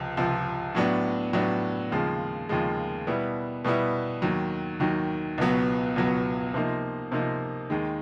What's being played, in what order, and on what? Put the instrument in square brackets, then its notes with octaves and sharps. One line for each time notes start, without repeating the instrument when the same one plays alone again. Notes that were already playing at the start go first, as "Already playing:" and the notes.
Already playing: [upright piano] C#2 C3 F3
C#2 C3 F3
A2 F#3 B3 D4
A2 F#3 B3 D4
D#2 C#3 F3 G#3
D#2 C#3 F3 G#3
B2 G3 B3 E4
B2 G3 B3 E4
D#2 D#3 F#3
D#2 D#3 F#3
C#2 B2 F#3 B3
C#2 B2 F#3 B3
C3 F3 A#3 D#4
C3 F3 A#3 D#4
D#2 D#3 G#3